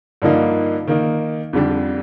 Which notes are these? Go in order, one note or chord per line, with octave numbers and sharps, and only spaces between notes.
G2 D3 F3 A#3 D#4
D#3 A#3 D#4
F2 D3 G3 D4 G4